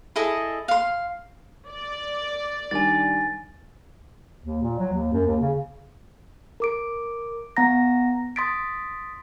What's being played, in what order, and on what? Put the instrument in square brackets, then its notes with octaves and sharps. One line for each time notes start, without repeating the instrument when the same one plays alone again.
[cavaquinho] E4 G#4 A4 D#5
F5 C6
[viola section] D5
[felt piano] D#3 G3 D4 [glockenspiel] G#5 A6
[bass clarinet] D#2
A#2
F#3
D#2
F#2
D#2
C#3
[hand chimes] A#4 D6 D7
B3 F#5 A#5 A#6
C6 D#6 A6 B6 D7